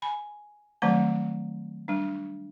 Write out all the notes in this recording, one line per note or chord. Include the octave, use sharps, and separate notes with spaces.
G#5 B5
D#3 F#3 G3 A3 C4 A#5
G3 D4